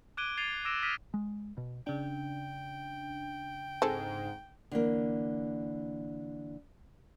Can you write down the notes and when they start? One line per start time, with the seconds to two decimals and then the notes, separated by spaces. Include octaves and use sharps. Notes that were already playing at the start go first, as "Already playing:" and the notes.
0.17 D6 F#6 G#6 D7 D#7 G7
0.37 G#6 A6 C7 D#7 F7 G7
0.65 D6 E6 A#6 D7 E7
0.83 D#6 F6 A#6 B6 D7 D#7
1.14 G#3
1.57 B2
1.87 C#3 D4 G5
3.82 G#2 C4 G#4 A4
4.71 D3 E3 A#3